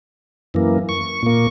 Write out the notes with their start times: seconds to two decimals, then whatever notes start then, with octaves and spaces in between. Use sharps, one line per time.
0.54 F#2 E3 A#3
0.89 C#6
1.23 A#2 A#3